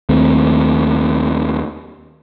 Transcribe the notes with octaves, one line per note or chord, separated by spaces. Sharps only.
D#2 A3 C4